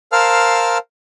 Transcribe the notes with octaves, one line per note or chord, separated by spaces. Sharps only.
A#4 C5 F5 A5 E6 F6